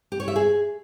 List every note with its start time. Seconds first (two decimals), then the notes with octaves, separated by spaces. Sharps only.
0.12 G4
0.20 C#5
0.28 E5
0.36 G#4